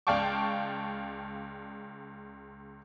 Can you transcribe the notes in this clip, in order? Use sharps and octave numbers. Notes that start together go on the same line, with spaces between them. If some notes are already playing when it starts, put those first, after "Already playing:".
C#2 D5 F5 G5 A5 C#6